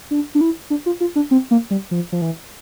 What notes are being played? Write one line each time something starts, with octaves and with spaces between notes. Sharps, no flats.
D4
D4
E4
D4
F4
F4
D4
C4
A#3
G3
F3
F3
E3